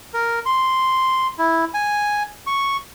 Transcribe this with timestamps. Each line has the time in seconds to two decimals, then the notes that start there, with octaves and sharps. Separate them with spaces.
0.14 A#4
0.46 C6
1.38 E4
1.74 G#5
2.47 C#6